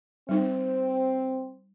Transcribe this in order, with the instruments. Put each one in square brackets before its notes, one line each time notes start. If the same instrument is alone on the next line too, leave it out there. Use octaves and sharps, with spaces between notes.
[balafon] G3 D#4 [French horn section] C4